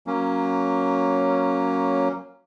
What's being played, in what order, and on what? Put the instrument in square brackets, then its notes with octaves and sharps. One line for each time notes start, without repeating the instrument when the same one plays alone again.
[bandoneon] F#3 A#3 C#4